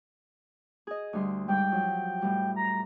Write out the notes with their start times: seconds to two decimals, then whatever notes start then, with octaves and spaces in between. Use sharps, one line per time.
0.87 G#4 D#5
1.13 D2 G3 C6
1.48 G#2 G3 G5
1.72 F3 F#3
2.22 A2 G3
2.56 A#5